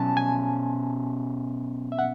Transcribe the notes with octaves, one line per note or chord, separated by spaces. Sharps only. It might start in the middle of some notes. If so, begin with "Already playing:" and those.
Already playing: B2 F#3 C#4 G#5 A5
G#5
E5
F#5